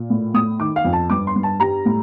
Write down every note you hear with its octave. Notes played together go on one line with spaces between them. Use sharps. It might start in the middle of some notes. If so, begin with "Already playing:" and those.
Already playing: A#2
A2
A2 D#6
D#3 D6
F5
F2
A5
G2 D6
C6
G2
A5
G3 A#5
A2